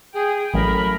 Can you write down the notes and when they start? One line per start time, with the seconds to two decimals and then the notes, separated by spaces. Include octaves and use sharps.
0.14 G#4 G5
0.54 A1 F#3 A3 A#4 B5